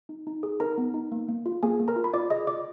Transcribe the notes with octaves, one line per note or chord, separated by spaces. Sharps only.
D#4
D#4
G#4
D#4 A#4 A#5
B3
D#4
A#3
A#3
F4
A#3 G#4 G#5
A#3
A#4 A#5
F4
B5
F4 D5 D6
G#4 D#5 D#6
F4 D5 D6